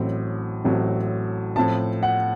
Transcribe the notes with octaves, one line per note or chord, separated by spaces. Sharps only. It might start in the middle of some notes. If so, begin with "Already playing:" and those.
Already playing: A1 A2 F#3 C4
A1 A2 F#3 C4
A2 F3 C4 A5
F#5